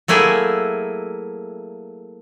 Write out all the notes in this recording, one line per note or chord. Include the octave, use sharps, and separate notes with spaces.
F#3 A3 A#3 E4 G#4